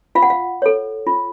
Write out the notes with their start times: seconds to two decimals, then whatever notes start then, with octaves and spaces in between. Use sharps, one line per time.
0.15 F4 F5
0.22 F#5
0.30 F5
0.62 A4 C#5
1.07 F4